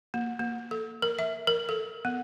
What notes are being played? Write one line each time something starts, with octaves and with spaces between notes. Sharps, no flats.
A#3
A#3
A4
A#4
E5
A#4
A4
B3